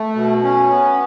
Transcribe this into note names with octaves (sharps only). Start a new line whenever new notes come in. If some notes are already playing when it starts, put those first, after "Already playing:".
Already playing: A3
B2
C#4
B3